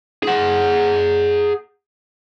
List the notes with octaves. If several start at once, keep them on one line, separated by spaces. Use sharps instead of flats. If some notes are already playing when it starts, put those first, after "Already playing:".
G#4 F#5